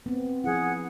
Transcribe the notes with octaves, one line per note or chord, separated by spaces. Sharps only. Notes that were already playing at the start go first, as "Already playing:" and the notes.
B3 C4
F3 C4 E4 G#4 F#5